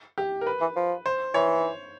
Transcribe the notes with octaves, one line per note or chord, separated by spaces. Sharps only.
G4
A#4
B4
E3
F3
C5
E3 C#5